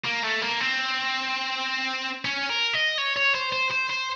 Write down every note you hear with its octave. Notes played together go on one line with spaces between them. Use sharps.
A#3
A3
A#3
C4
C#4
A#4
D#5
C#5
C#5
C5
C5
C5
C5